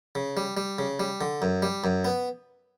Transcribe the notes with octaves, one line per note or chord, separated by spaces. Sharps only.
C#3
G3
G3
C#3
G3
D3
F#2
G3
F#2
B3